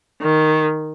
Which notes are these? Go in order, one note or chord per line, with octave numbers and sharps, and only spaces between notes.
D#3